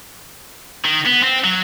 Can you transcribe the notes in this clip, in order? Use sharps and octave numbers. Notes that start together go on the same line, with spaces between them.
D#3
B3
C4
F#3